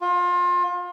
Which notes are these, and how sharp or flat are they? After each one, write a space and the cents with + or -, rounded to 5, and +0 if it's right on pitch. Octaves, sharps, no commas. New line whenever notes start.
F4 +30